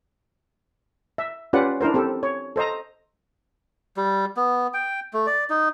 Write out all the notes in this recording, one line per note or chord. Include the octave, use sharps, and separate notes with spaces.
E5
C#4 F4 G4 B4 D5 F#5
D4 E4 A#4 C5
C4 G4 A4
C#5
A4 C5 D#5 A#5
G3
B3
G5
A3
D5
D#4